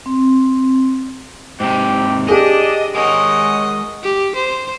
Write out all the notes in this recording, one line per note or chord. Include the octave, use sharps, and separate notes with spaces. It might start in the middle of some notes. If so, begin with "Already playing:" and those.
C4
G#2 C3 G4
D4 G4 G#4 D#5
G#3 C#4 A#4 D#5 F#5
G4
C5